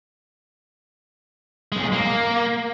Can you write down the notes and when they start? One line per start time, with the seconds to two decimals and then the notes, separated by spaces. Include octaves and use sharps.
1.72 B1 G#3
1.92 A#3